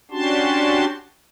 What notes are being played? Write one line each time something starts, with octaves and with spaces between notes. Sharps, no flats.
C#4 D4 F#4 G4 A5 C6